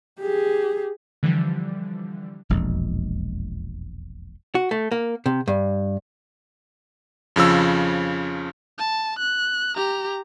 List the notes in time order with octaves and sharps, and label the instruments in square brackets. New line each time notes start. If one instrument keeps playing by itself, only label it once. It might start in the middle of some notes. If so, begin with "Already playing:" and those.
[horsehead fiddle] G4 G#4
[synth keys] D3 E3 F3 G3
[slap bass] E1 A#1 F2 G#3
[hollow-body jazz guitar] F#4
A3
A#3
C3
G2
[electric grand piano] F2 C#3 F3 E6
[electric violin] A5
F#6
G4 A#5